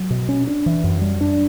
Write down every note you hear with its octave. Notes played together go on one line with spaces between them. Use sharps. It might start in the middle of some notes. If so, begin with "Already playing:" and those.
Already playing: F#3
B2
C#4
D4
E3
F#2
G3
D4